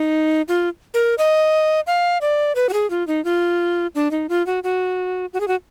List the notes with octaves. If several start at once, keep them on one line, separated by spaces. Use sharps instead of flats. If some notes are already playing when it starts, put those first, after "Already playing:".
Already playing: D#4
F4
A#4
D#5
F5
D5
B4
F#4
G#4
F4
D#4
F4
D4
D#4
F4
F#4
F#4
F#4
G#4
F#4